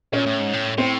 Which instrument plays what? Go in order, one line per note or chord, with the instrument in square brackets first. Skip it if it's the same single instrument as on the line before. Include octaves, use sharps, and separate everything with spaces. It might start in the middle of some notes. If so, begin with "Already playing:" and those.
[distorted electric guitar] A#2 [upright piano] C#4 C#5
[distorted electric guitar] A2
G#2
A2
[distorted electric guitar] A2 [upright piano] C4 C5